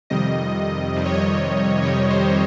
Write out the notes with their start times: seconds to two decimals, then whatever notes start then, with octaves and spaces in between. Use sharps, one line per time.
0.10 F2 C3 D#3 G3 D#5
0.96 F2 C3 D#3 G3 D#5
1.05 C#5
1.14 D#5
1.81 F2 C3 D#3 G3 C#5
2.10 C5